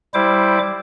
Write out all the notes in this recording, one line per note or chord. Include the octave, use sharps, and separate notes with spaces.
G3 E4 C5 D6